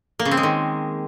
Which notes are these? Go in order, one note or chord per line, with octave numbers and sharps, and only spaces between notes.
A#3
C#3
C4
G#3
D#3